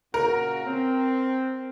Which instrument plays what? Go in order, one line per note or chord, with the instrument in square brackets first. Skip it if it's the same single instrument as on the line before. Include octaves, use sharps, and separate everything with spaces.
[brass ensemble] A#2 C#3 F#4 [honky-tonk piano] A#4
[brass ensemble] C4